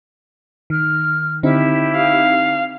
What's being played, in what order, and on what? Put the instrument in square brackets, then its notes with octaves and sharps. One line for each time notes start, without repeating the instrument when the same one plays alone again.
[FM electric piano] D#3 [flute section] F6
[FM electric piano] D3 C4 D#4 [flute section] E4 G4
[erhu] F5